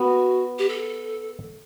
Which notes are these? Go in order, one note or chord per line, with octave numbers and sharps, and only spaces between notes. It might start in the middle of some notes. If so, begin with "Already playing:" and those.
Already playing: B3 F#4
G4
A4